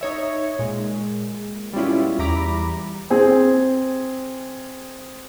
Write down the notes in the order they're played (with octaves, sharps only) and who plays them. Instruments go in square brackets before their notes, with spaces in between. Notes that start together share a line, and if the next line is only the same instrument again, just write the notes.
[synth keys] D#4 C#5 E5
A#2 G#3
G3 G#3 B3 C#4 E4 F4
E2 G3 E4 A#5 B5 D6
[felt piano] C4 G#4